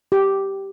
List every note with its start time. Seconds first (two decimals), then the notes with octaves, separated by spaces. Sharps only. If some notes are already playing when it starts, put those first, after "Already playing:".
0.12 G4